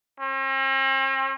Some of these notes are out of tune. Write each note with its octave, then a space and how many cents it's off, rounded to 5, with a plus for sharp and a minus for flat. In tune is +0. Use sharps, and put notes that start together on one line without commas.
C4 +45